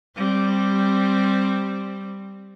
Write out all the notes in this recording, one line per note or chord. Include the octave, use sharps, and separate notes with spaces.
G3 C4